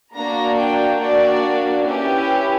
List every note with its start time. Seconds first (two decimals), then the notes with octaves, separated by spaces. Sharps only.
0.13 A#3 D4 F#4 A#5
0.57 G5
0.99 A#3 D4 F#4 D5
1.85 C#4 E4 G4 B4